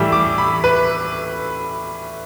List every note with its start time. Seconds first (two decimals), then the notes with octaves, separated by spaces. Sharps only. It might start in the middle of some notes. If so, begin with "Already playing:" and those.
Already playing: A2 E3 G3 E6
0.12 D6
0.38 B5
0.64 B4